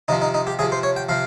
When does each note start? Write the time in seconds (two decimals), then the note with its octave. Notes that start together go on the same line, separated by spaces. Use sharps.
0.08 C3 F3 D#4
0.22 D#4
0.34 D#4
0.47 G4
0.59 C3 F3 G#4
0.72 C5
0.83 C#5
0.96 G5
1.09 C3 F3 F5